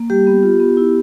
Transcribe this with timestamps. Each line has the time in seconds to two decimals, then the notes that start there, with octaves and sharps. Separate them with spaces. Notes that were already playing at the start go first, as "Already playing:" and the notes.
Already playing: A#3
0.10 G3 G4
0.27 B3
0.43 F4
0.60 B3
0.77 E4